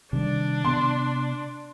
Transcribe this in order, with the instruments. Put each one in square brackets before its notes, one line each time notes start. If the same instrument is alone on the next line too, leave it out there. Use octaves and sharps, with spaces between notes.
[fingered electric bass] C3 D#3 G3 [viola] D4
[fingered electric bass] C3 B3 [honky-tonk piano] C6